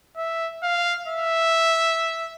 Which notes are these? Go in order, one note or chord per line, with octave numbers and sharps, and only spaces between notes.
E5
F5
E5